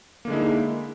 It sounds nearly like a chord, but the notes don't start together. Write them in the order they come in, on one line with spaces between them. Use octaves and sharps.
A#3 D3 G#3 E4 D#4